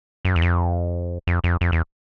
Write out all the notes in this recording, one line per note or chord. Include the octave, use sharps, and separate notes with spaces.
F#2
E2
F2
F2
F2
F2
E2